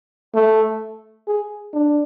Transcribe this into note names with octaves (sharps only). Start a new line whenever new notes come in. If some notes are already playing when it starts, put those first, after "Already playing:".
A3
G#4
D4